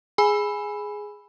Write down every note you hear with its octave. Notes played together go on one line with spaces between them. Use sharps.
G#4 G#5 B5